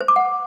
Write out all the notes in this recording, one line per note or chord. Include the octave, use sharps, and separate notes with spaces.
C5
D6
F#5